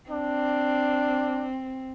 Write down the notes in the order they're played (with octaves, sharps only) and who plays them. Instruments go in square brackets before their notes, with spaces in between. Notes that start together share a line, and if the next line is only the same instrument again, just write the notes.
[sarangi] C4 [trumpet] D4